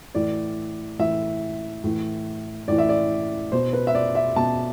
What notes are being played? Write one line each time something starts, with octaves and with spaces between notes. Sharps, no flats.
A2 E3 D5
A2 E3 E5
A2 E3
A2 E3 D5
E5
D5
B2 C5
B4
E5
D5
E5
B2 A5